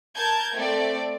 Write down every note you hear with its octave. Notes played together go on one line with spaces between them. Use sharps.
A#4 A5 G6 G#6
A3 C4 D5